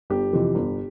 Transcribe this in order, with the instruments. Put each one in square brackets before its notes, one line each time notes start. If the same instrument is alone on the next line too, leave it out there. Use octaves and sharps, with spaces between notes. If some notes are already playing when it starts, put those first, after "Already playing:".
[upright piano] G1 G4
F2 C3 E3
G1